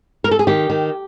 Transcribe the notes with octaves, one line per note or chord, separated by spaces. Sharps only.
A#4
A4
G#4
D#3 G4
D#3